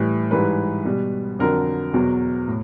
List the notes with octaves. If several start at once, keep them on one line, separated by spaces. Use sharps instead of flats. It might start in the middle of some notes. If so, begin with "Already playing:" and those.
Already playing: A2 E3 G3
G#2 E3 G3 B4
B2 G3
F2 D3 F#3 A#4
E2 B2 F#3
A2